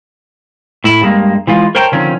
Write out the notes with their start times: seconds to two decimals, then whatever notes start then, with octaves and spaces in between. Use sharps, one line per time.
0.84 A2 E4
1.01 G2 G#3 A#3
1.47 E3 G#3 F4
1.75 A#4 C5 C#5 G5 A5 A#5
1.92 D3 D#3 F3 C4 C#4